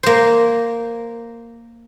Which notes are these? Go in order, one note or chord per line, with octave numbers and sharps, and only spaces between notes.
A#3 C5